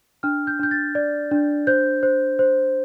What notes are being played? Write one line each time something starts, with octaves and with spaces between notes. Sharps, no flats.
D4 F6
G6
D4 G6
A6
D5
D4
C5 G6
C5
C5